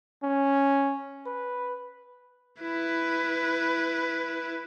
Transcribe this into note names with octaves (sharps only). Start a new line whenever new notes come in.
C#4
B4
E4 B4